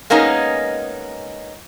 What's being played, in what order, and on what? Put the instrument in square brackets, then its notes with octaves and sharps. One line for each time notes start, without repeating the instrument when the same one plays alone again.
[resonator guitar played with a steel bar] G#3 A#3 B3 C#4 D#4